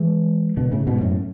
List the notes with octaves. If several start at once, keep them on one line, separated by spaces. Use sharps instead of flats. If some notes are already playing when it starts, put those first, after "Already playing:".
Already playing: E3 G#3
B2 D3
A2 C#3
G#2 B2
F#2 A2